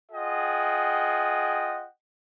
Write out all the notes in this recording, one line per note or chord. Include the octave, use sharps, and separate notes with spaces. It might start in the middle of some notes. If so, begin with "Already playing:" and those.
F4 G#4 D#5 F#5 G5